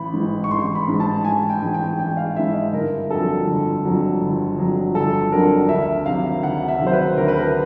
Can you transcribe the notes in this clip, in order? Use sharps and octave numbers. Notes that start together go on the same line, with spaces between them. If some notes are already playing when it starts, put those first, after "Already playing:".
Already playing: A1 B5
G#2 E3
C#6
A1 C6
B5
G#2 E3
A5
A1 G#5
G5
G#2 E3 G#5
G5
A1 G5
F5
G#2 E3 E5
D#5
G1 A#4
F2 D3 F#3 A4
G1
F2 D3 F#3
G1
F2 D3 F#3
G1 A4
F2 D3 F#3 A#4
D2 E5
C3 D#3 F#3 F5
D2 F#5
E5
C3 D#3 F#3
C5
B4
D2 A#4
B4
A#4